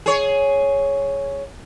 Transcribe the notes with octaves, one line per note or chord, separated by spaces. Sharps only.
G#4 C#5